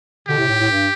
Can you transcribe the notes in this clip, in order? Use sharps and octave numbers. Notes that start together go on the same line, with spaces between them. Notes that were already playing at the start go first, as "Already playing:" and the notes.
B2 D3 G4
A2 C3
A2
A2
G2